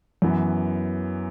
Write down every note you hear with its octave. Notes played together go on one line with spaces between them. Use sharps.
F#2 E3 B3